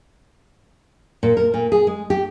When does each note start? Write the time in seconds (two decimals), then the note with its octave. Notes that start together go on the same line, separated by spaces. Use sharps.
1.23 A#2
1.37 A#4
1.54 A#2
1.72 G#4
1.87 G#3
2.10 G4